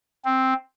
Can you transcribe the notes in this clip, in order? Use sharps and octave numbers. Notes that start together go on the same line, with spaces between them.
C4